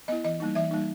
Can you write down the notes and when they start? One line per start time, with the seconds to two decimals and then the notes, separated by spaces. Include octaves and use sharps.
0.08 B3 E4 D#5
0.24 E3 D#5
0.40 G3 A#3 D#4
0.55 E3 E5
0.71 G3 A#3 D#4